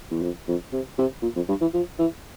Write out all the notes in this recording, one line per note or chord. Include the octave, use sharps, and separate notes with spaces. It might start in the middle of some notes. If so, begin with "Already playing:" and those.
E2
F2
F2
C3
C3
A#2
F2
G2
E3
F3
E3